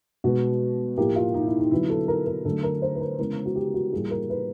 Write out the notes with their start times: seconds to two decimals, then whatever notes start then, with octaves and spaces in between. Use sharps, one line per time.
0.24 B2 G#3 B3 F#4
0.98 A2 F3 A#3 G4
1.16 F4
1.34 D#4
1.47 E4
1.59 D#4
1.71 D3 F#3 B3 E4
1.90 A4
2.08 A#4
2.27 A#4
2.45 D3 F#3 A3 A4
2.63 A#4
2.82 C5
2.95 B4
3.00 A#4
3.18 C#3 E3 G#3 B3 A#4
3.45 F#4
3.56 G4
3.74 F#4
3.93 A2 E3 G3 A#3 G#4
4.11 A#4
4.30 B4